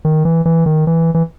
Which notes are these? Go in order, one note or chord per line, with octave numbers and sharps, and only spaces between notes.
D#3
E3
E3
D#3
E3
E3